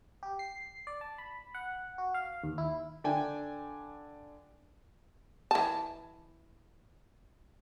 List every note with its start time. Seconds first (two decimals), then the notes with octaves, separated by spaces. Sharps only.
0.23 G4
0.39 C7
0.87 D5
1.01 A5
1.18 B5
1.55 F#5
1.98 F#4
2.14 F5
2.43 D#2
2.58 E4
3.04 D3 D4 G5 G#5
5.51 E3 A5